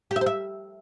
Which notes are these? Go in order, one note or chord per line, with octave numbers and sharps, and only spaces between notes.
G4
E5
C5
E5